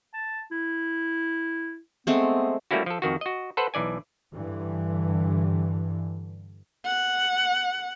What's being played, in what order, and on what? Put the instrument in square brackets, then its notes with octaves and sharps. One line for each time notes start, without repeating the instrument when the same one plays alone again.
[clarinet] A5
E4
[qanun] G#3 A3 C4 [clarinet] B3
[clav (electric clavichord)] G3 A3 A#3 C#4 E4 F#4
F3 A4
F2 D#3 F#4
F#4 D#5
A4 B4 C5 F#5
B1 E3 D5 G#5
[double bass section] G2 D3 E3
[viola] F#5